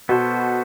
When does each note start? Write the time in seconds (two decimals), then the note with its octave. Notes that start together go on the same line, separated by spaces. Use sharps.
0.09 B2 B3 F#4 A4 C5